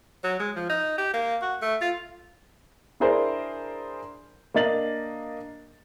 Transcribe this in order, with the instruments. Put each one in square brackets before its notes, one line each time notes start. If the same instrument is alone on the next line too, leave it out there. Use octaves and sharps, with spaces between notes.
[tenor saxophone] F#3
G#3
F3
D#4
G4
A#3
F#4
A3
F4
[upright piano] D4 E4 G#4 A#4 C5 D5
A#3 D4 D#5 A6 F#7